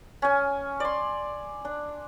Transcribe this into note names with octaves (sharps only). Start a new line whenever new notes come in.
C#4 G#5
D5 C6
D4